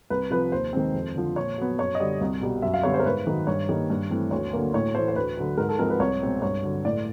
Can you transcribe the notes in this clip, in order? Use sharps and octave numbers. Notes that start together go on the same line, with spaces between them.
C2 B4
C3 F3 B4
D#2 C5
D#3 G#3 C4
F2
D3 F3
A#2 C#5
F#3 B3
F#2 C#5
D#5
D3 G3 D5
C2
B2 G3
F#2 E5
F5
D3 G3 B3 C#5
C5
A#4
G#2 B4
D#3 F#3
G2 C#5
D#3 G3 A#3
G2
E3 A3 C4
D2 C#5
D3 F#3 A#3
A2 C#5
E3 A3 C5
C5
D2 B4
D3 F#3
G#2 A#4
A4
F3 G#3 C4 A#4
B4
C2 C#5
B2 G#3 C4
G2 C#5
D3 F#3
A2 D5